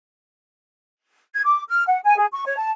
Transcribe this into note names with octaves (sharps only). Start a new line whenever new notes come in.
G#6
D6
F6
F#5
G#5
G#4
C#6
C#5
A5